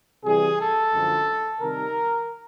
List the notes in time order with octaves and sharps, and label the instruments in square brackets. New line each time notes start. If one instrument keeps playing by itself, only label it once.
[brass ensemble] C3 E3 G3 G#4
A4
F#2 D3 F3 G#3
C3 D#3 G3 A#4